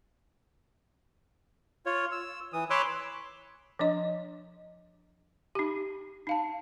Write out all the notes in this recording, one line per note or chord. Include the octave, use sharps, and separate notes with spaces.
F4 C#5
E6
E3 D#6
C#5 B5 C6 D6 E6 F#6
F3 D4 D#5
D#4 G4
D#4 F5 A5